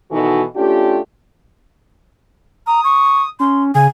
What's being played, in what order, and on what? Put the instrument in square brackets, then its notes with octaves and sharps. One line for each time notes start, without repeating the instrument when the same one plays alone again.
[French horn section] B2 D#3 E3 D#4 F#4 A4
A3 C#4 D4 F4 G4
[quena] A#5 [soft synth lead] D#6
[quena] C#6
[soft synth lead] C#4 [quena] C6
[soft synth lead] C#3 [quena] G#5